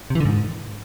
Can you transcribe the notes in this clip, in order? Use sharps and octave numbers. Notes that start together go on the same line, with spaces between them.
C3
E3
D3
G#2